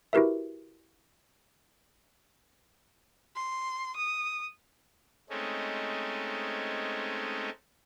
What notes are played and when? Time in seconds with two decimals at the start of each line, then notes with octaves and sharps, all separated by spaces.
0.13 E4 F#4 G4 A#4 B4 E5
3.36 C6
3.96 D#6
5.30 G#3 A3 C4 C#4 D#4